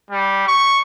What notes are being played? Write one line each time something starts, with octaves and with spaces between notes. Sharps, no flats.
G3
C#6